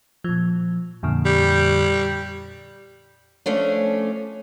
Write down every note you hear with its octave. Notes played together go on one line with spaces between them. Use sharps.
A#2 F3
F2 A#2 D3
G3
F3 A3 C#4 D4